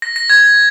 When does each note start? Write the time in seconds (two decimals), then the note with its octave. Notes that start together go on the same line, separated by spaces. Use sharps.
0.02 A#6
0.16 A#6
0.30 G#6